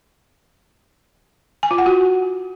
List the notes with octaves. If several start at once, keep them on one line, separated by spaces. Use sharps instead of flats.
G#5
F4
F#5
F#4